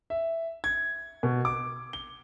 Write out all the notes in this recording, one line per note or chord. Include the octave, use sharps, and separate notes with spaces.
E5
G#6
B2
D6
G7